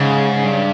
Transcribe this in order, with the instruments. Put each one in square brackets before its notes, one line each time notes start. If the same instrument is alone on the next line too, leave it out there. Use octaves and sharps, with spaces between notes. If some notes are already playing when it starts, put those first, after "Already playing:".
Already playing: [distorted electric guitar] G#2 [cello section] C#3
[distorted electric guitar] G2